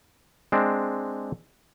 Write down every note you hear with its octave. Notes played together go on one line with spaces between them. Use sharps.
G#3 C4 D4